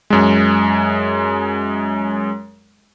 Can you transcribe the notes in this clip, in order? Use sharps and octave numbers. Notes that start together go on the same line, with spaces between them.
F#2 G#3